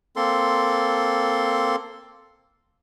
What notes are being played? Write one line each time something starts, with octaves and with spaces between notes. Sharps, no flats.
A#3 C4 A4 C6